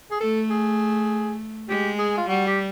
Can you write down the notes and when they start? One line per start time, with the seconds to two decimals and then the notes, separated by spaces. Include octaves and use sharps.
0.11 G#4
0.21 A3 A4
0.50 G#4
1.69 G#3 G4
1.99 G#4
2.17 F4
2.28 G3 F#4
2.47 G4